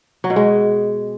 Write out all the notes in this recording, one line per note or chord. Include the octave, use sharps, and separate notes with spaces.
F#3
B2
G#3